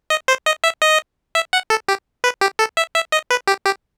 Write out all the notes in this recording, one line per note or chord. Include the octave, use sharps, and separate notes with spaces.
D#5
C5
D#5
E5
D#5
E5
F#5
A4
G4
B4
G4
A4
E5
E5
D#5
B4
G4
G4